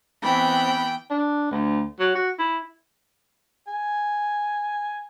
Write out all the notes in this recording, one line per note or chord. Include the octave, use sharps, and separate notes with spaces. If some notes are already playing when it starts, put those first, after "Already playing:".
E3 B3 C4 G5 B5
D4
D2
F#3
F#4
E4
G#5